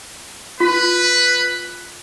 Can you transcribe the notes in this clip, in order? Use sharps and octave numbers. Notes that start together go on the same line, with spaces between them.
F4 B4